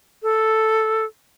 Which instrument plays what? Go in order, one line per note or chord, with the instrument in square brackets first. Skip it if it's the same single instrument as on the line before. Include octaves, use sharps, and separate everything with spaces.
[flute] A4